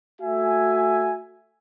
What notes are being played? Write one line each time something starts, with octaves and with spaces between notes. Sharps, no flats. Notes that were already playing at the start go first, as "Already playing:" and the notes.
A3 F#4 E5 G#5